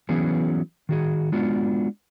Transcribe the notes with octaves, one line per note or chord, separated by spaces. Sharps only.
E3 F#3 B3 C#4 G#4
D#3 F#4 G#4
G#3 B3 D4 F4 F#4